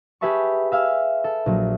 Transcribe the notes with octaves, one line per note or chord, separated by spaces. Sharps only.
G4 G#4 B4 E5 A5 C#6
E5 F5 G#5 E6
A4
A#1 F#3